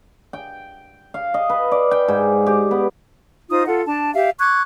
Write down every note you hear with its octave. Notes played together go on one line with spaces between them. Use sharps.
G5
F5
D#5
B4
D5
G5
G#2
G4
B3
D#4 F4 C5 D#6
F4 A4 F#5
D4 A5
G4 E5 F5
C#6 D6 F#6 G#6